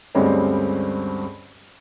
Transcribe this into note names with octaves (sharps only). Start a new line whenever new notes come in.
D2 G2 G3 G#3 C4 C#4